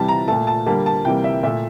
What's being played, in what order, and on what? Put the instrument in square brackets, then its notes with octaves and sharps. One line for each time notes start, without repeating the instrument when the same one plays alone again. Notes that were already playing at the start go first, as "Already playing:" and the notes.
Already playing: [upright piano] C3 E3 G3 A5
A#5
A#2 A3 A5
A5
D3 G3 A#3 A5
A5
C3 E3 G3 A#3 G5
E5
A#2 A3 E5